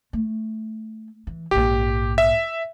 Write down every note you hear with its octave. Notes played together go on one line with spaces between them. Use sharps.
A3
E3
A#1 G#2 G4
E5